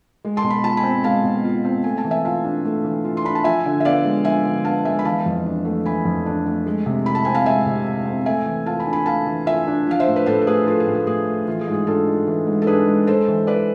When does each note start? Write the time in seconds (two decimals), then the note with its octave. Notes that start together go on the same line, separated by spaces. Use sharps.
0.25 G#3
0.37 A5 C6
0.44 B2
0.50 B5
0.64 F4 A5
0.77 G#5 B5
0.84 C4
1.04 G#3 F5 A5
1.24 B2
1.45 F4
1.65 C4
1.84 A3 G#5
1.98 A5
2.05 E3
2.11 E5 G#5
2.25 F4 F5 A5
2.44 D4
2.65 A3
2.85 E3
3.05 F4
3.17 C6
3.24 D4 B5
3.35 A5
3.44 F3 E5 G#5
3.66 D3
3.80 E5
3.85 B3 D5 F5
4.05 G#3
4.25 F3 E5 G#5
4.45 D3
4.65 B3 F5 A5
4.85 G#3 E5 G#5
4.99 B5
5.05 E3 F5 A5
5.26 F2
5.46 D4
5.65 A3
5.86 E3 G#5 B5
6.05 F2
6.26 D4
6.46 A3
6.66 G#3
6.86 C3
7.05 E4 B5
7.15 A5
7.25 C4 G#5
7.35 F5 A5
7.46 G#3 E5 G#5
7.66 C3
7.86 E4
8.06 C4
8.26 A3 E5 G#5
8.46 E3
8.66 F4 F5 A5
8.80 G#5 B5
8.86 D4
8.93 G#5 B5
9.06 A3 F5 A5
9.27 E3
9.46 F4 E5 G#5
9.67 D4
9.87 F3 F5
10.00 C5 E5
10.07 A2
10.16 B4
10.26 A2 A4 C5
10.42 A4
10.47 A3 G#4 B4
10.67 F3 F4 A4
10.80 G#4
10.87 A2
10.94 G#4
11.06 A2 G#4
11.27 A3
11.48 E3 F4
11.61 G#4
11.67 G#2
11.74 G#4
11.87 D4 F4 A4
12.07 G#3
12.27 E3
12.47 G#2
12.62 A4
12.67 D4 G#4 B4
12.87 G#3
13.07 G#3 A4 C5
13.28 E3
13.47 E3 B4 D5